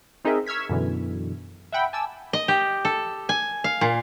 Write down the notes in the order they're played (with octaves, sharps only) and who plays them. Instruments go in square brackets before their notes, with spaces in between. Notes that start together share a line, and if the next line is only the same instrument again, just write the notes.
[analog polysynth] C4 D#4 G#4 A#4 D#5 E5
C#6 E6 F6 G#6 B6
F#2 B2 D3 E3
E5 F#5 G5 B5
G#5 A5 D6 E6
[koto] D#5
G4
A4
G#5
F5
A#2